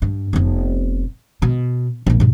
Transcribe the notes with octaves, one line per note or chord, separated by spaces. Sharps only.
G2
F1 B3
B2
A#1 A#3
G2 B2